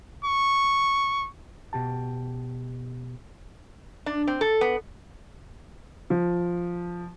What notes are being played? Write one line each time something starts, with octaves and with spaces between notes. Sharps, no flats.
C#6
B2 G4 A5
D4
C4
A4
B3
F3